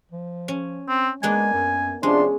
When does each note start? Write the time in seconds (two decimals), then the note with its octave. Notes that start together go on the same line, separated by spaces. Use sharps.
0.11 F3
0.48 C#4
0.89 C4
1.23 G#3 A#3 B3 D4 G#5
1.53 F#2
2.03 C3 F3 G#3 C#4 D4 C6